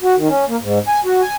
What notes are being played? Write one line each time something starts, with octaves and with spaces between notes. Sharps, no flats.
F#4
D#3
C#4
A#3
G#2
G#5
F#4
G#5